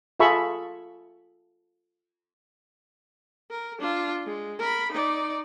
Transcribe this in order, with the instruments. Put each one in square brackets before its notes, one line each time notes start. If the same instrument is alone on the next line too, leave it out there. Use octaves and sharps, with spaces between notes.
[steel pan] F4 G#4 A4 E5 B5 C#6
[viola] A#4
D4 F4
G#3
A#4 B5
D#4 D5